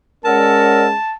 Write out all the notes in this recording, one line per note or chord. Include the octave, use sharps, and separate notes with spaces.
G#3 C#4 A#4 D5 F#5 A5 E6